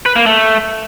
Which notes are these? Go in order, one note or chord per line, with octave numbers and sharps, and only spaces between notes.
B4
A#3
A3